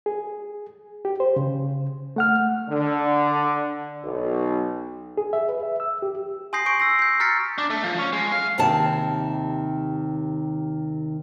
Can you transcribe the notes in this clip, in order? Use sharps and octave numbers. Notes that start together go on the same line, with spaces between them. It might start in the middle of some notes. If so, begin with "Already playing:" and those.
G#4
G4
C5
C#3
A3 F#5 F6
D3
B1
G#4
E5
B4
E5
E6
G4
G#5 C6 D#6 G6 A#6 C7
C#6 G6 D7
E6 A#6 C7
G6 C7
A#5 F6 G6 A6 B6 C#7
D4
A3
F3
C#4
G#3
F5
D#2 C3 D#3 A5